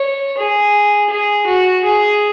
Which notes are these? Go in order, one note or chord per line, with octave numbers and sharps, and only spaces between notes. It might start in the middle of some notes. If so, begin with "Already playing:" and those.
Already playing: C#5
G#4
G#4
F#4
G#4